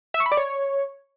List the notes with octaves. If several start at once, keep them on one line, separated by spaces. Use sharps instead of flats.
E5
C#6
B5
D5
C#5